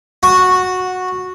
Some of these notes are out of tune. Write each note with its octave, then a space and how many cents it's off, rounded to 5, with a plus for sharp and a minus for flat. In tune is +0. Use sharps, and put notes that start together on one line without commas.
F#4 -10